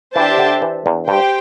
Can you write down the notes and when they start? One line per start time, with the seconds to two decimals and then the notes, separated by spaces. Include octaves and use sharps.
0.15 E3 D4 G4 C5 E5 A5
0.38 D3
0.62 E3
0.86 E2
1.08 G2 G4 C5 G5